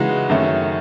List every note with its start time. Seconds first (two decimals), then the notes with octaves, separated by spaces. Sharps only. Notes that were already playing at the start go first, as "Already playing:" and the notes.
Already playing: C#3 E3 G#3 D#4 F#4
0.29 F#2 D#3 A3 C#4